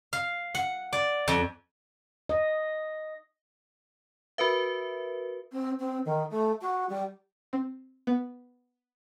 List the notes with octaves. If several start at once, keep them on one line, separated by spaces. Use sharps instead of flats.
F5
F#5
D5
F2
D#5
F#4 A#4 B4 E5
C4
C4
D#3
A3
F#4
G3
C4
B3